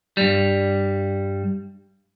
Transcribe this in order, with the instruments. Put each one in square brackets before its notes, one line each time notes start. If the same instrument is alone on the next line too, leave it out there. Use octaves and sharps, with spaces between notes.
[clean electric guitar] G2 G3